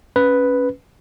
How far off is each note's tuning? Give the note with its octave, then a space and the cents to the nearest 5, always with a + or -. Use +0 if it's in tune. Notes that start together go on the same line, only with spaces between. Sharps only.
C#4 +0 B4 +0